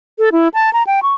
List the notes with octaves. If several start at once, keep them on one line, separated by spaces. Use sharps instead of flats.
A4
E4
A5
A#5
G5
C#6